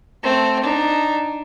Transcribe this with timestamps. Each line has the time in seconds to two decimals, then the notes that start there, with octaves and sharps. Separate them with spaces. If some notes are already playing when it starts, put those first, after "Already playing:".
0.23 A3 C4
0.63 D4 D#4